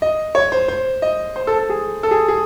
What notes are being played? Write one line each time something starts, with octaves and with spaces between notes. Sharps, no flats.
D#5
C#5
C5
C5
D#5
C5
A4
A4
G#4
A4
G#4
G#4